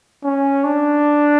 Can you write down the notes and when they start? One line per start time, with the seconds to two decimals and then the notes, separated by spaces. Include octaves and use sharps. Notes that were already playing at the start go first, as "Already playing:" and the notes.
0.24 C#4
0.64 D4